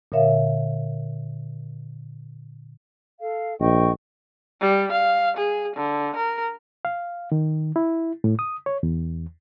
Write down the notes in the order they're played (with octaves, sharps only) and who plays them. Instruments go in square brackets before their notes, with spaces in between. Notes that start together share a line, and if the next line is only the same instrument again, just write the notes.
[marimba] A#2 D3 A#4 C#5 E5 F5
[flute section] A4 F5
[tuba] A#1 [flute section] D#5 G5 C#6
[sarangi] G3
F5
G#4
D3
A#4
[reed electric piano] F5
D#3
E4
A2
D#6
C#5
E2